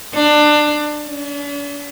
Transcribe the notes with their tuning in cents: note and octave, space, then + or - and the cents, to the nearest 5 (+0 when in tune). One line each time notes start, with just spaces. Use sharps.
D4 +20
D4 -45